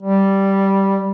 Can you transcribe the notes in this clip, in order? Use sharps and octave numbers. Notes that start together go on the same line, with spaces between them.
G3